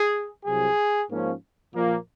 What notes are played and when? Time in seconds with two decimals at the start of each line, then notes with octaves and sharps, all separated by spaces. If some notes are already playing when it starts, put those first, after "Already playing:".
Already playing: G#4
0.46 C2 C3 F#3 G#4
1.10 G#2 F3 A#3 C#4
1.74 A#2 F3 A#3